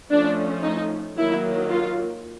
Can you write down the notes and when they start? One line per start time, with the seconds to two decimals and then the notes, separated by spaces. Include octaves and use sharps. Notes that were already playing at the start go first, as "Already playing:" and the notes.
0.10 F3 A3 C#4 D4
0.63 D#4
1.17 D#3 F#3 A#3 E4
1.70 F4